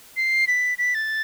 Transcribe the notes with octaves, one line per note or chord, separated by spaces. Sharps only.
C7
B6
B6
A6